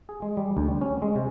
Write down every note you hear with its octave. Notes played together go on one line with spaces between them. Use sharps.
G#4
G#3
G3
D2
G3
C#4
G#3
C3